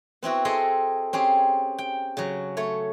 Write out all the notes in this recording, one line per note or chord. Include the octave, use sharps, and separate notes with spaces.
B3 C4 E4 F#4
C4 G#4 A4 D#5
C4 C#4 G4 G#4
G5
C#3 F#3
A3 C#5